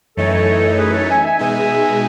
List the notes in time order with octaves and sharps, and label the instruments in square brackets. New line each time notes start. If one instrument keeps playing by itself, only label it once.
[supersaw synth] F#2 E3 A3 D#4 [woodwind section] A4 C#5
[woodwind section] A4 C#5
C#5
G#4 B4
A4 C#5
E5 G#5
E5 G#5
[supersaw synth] B2 G#3 D#4 [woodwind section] E5 G#5